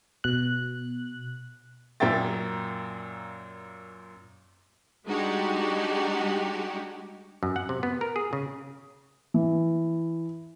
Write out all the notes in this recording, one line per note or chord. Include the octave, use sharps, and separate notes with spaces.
B2 F#6
F#2 A#2 A#3 E5 G5 A6
G3 G#3 D4 D#4 F#4 G4
F#2
F#5
C3
B3
A#4
G#4
C#3
E3